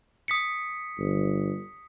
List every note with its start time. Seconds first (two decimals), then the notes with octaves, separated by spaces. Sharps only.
0.28 D#6 B6 C#7
0.99 G1